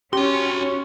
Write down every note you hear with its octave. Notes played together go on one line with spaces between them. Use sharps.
C#4 F#4 G4 C#5 C6